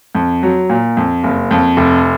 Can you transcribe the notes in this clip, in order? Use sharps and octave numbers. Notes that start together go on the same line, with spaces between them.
F2
F#3
A#2
F2
F#1
F2
F1